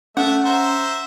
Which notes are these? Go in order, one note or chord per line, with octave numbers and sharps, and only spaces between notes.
A3 C#4 E5 F#5
C5 E5 A#5